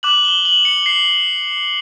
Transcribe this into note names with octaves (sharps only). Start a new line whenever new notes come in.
D6 F#6 F#7
G7
F#7
C#7
C7